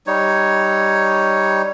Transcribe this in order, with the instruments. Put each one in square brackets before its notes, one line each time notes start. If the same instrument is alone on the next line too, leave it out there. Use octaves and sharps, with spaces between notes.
[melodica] G3 D#4 C#5